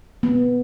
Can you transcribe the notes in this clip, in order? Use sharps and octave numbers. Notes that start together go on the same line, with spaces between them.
B3